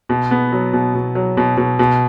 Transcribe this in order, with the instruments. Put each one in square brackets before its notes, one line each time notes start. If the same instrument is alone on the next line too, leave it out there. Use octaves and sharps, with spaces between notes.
[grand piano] B2
B3
F#3
B2
B2
F#3
B2
B2
B2